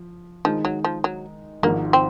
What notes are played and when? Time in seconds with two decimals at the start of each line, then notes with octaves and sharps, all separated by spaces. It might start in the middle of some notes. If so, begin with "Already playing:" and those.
Already playing: F3
0.45 D#3 F3 G#3 D#4
0.65 F#3
0.84 F3
1.04 F#3
1.63 G#1 G#2 F3 A#3
1.93 C4